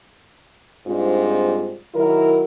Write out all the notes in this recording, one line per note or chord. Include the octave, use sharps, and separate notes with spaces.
G#2 G3 C4 D4 F4
D#3 F#3 E4 A#4